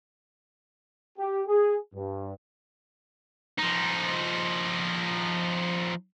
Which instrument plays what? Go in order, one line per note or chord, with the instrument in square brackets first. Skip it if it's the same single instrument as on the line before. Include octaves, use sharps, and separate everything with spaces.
[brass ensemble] G4
G#4
G2
[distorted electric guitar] F3 D#4